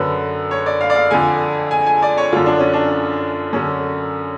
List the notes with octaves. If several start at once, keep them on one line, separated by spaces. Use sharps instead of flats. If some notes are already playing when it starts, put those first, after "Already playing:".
Already playing: F#2 D3 B4
C#5
D5
F5
D5
F5
F2 D3 G#5
G#5
G#5
D5
C#5
F#2 D3 F4
D4
C#4
D4
F#2 D3 C#4